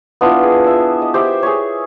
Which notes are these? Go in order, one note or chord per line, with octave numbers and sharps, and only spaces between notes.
B3 D4 E4 F4
G#4
E5
D#5
G4 C5 E5 G5
G#4 C#5